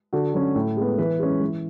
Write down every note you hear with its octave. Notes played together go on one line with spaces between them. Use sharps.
D3 F#4
F#3 C#4
A2
G#3 B3
E3 B4
G#3 C#4
E3